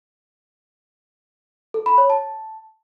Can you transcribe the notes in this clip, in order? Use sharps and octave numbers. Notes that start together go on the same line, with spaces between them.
A4
B5
C#5
A5